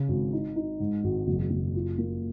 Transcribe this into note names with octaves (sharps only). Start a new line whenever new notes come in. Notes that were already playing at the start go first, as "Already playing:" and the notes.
Already playing: C#3
G#1
D#4
D#4
G#2
G#1
F#1
F#1
F4
A#3